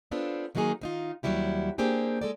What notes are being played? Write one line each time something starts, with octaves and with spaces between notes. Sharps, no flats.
B3 C4 D4 F4 A4
D#3 F#3 A#3 D#4 G#4
D#3 D#4 F4
D#2 F#3 G3 E4 G4
A#3 C4 D4 G4 G#4
G#3 A4 D5